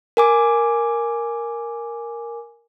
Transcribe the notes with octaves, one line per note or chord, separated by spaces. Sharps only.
A#4 G#5 D6